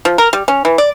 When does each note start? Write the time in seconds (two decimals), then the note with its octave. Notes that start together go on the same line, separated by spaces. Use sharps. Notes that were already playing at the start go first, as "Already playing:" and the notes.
0.05 F3
0.18 A#4
0.33 G3
0.48 C#4
0.65 E3
0.78 D5